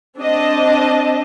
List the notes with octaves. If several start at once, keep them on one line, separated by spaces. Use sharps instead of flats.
C4 D4 D#5 A5